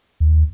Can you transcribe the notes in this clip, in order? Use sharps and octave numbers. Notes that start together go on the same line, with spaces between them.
D#2